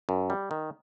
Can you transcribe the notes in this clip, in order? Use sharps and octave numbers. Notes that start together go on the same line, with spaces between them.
F#2
G3
D#3